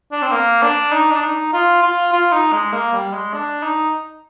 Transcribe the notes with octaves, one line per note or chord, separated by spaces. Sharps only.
D4
C4
A#3
D4
D#4
D4
D#4
F4
F4
F4
D#4
G#3
A#3
G3
G#3
D4
D#4